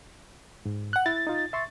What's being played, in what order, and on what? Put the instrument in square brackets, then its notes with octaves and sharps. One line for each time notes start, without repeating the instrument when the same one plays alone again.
[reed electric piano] G#2
[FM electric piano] F#5 F#6
[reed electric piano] E4 [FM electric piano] A6
[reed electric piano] D#4 F4
E5 C6 C#6